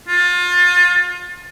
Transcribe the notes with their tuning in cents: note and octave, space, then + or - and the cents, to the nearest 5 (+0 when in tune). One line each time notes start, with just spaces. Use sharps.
F4 +30